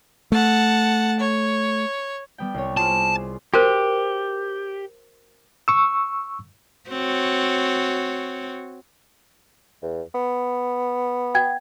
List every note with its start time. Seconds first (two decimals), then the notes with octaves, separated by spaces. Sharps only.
0.32 A3 F#5 A5
1.20 C#5
2.38 G3 B3 G5
2.54 C2 C#5
2.77 F4 G#4 C5 A5
3.54 F#4 G4 A#4 C5
5.68 C#6 E6
6.89 C4 F#4 C#5
9.82 E2
10.15 B3
11.35 F#5 G5 G#6